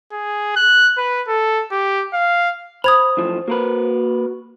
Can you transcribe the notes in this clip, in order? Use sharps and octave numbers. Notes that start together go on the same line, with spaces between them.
G#4
F#6
B4
A4
G4
F5
C5 B5 D#6 G#6 F7
F#2 A2 F3
A#3 F#4 A#4 B4